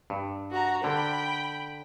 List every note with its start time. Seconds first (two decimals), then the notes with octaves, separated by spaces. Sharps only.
0.10 G2
0.51 F#4 A#5
0.84 D3 G5 B5